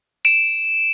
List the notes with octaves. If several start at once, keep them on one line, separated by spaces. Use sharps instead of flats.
D7 E7